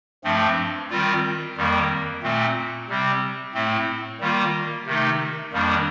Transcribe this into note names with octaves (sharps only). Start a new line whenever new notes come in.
G2 F3 A3 C4
D#3 G3 C4 F4
F2 D#3 G3 A#3
A#2 A3 C4
C3 G3 C4
A2 A3 C4
D#3 G3 A#3 F4
C3 D#3 A3 D#4
F2 D#3 G3 A#3 D4